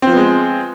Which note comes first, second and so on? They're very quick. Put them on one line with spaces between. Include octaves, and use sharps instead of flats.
C4 F3 B3 G#3